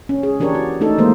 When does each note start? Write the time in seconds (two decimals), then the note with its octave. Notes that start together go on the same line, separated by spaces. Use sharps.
0.09 C#4
0.23 G#4
0.40 E3 D4 G4 A#4 C#5
0.55 F#4
0.81 A3 D4 D#4 A4
0.98 E3 G#3 A#3 C5